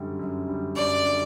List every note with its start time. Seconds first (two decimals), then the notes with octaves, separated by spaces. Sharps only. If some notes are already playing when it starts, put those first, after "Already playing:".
Already playing: F#2 D3 G3
0.19 F#2
0.48 D3 G3
0.76 F#2 D5
1.05 D3 G3